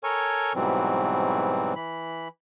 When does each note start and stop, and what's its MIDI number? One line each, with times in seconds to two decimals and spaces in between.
0.04 0.53 69
0.04 0.53 70
0.04 0.53 73
0.04 0.53 80
0.04 0.53 85
0.55 1.74 44
0.55 1.74 47
0.55 1.74 52
0.55 1.74 54
0.55 1.74 55
0.55 1.74 60
1.76 2.28 52
1.76 2.28 83